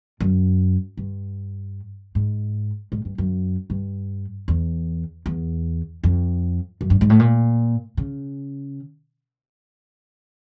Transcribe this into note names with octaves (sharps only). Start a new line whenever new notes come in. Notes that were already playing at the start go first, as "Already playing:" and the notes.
F#2
G2
G#2
G#2
G2
F#2
G2
E2
E2
F2
F#2
G2
G#2
A2
A#2
C#3